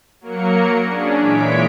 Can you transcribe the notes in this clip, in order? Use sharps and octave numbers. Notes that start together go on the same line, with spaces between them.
F#3 A#3 A#4 C#7
C#4 D4 G#4
A#2 E3 G#3 C#5 B6 D7